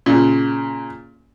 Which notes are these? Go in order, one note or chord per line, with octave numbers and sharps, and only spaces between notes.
A#2 C#3